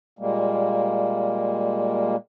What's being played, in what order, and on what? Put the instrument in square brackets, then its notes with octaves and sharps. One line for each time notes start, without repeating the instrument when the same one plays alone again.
[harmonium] A#2 G3 G#3 A#3